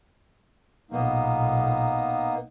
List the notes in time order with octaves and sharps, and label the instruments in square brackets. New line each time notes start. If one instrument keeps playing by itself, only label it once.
[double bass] B1 A#2 [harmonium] A#3 B3 D#4